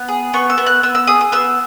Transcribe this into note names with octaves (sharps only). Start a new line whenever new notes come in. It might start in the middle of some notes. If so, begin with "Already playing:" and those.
Already playing: B3
G#4
B3 C#6
E6
B3
F#6
B3 E6
E6
G#4 D#6
D#6
B3 E6